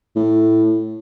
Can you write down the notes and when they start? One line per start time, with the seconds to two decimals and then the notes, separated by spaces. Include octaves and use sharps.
0.16 A2